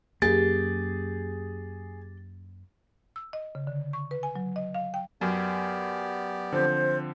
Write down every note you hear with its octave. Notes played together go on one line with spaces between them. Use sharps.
F#2 A#3 G4 G#4 A6
E6
D#5
C#3
D3
C#6
B4
G#5
F#3
D#5
F5
G5
F#2 B3 G4 D5
D3 F3 C4 C5